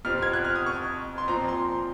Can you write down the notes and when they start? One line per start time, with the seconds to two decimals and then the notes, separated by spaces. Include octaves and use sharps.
0.05 F2 C3 F3 C4 F6
0.22 G#6
0.33 F#6
0.45 F6
0.56 D#6
0.66 C#6
1.18 C6
1.28 A#2 F3 C4 A#5
1.48 C6